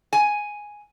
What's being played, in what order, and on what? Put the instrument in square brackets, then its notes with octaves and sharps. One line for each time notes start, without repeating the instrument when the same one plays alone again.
[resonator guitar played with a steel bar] G#5